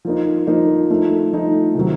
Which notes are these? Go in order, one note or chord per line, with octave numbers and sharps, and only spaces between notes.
F3 A#3 D#4
F3 A#3 D#4
F3 A3 D#4
F3 A3 D#4
C3 D#3 F#3